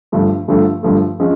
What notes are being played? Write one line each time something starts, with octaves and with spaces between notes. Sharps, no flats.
G2 D3 F3 A3
G2 D3 F3 A3
G2 D3 F3 A3
F3 G#3 C#4